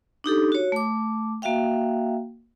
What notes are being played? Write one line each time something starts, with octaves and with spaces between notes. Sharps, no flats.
D4 D#4 G4 A4
F#4 C#5
A3 D6
A#3 F#4 E5 F5 G5